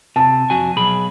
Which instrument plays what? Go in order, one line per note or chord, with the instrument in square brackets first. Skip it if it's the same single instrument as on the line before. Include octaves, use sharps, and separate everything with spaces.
[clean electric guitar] C3 [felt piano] A5
[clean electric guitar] F2 F#4 G#5
B1 G#4 B5